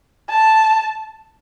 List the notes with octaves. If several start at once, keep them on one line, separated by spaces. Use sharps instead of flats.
A5